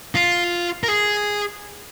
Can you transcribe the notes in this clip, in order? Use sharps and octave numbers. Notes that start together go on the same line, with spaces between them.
F4
A#4
G#4